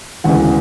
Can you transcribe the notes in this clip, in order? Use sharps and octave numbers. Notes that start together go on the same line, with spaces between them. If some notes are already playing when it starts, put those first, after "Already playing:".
E1 D2 C#3 E3 F#5